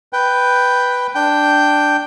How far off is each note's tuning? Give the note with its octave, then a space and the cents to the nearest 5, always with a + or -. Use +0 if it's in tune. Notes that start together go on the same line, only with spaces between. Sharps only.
B4 +0 G5 +0
D4 +0 G5 +0